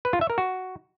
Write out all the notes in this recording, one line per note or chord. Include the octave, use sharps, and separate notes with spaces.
B4
F4
E5
A#4
F#4